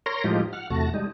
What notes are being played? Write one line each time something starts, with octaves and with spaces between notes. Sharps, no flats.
A#4 C#5 C6 A#6
A2 F3 G#3 D#4 F4 G4
F#5 F6
E2 C3 A3 F#4 A5 A#6
G3 G#3 D#4